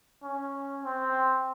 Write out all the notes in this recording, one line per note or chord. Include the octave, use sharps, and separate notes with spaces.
C#4
C4